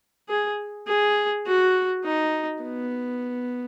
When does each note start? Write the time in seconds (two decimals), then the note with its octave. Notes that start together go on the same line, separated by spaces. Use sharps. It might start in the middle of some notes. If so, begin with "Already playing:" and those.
0.29 G#4
0.87 G#4
1.46 F#4
2.04 D#4
2.63 B3